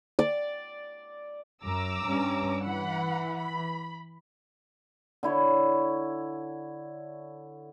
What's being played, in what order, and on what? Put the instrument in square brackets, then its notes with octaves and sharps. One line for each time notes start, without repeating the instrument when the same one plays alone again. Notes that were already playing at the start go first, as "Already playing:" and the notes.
[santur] D5
[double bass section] F#2 [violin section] A#5 D6 E6
[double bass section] G2 C#4
[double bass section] E3 [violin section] F#5 B5
[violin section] B5
[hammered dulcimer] D3 E4 C#5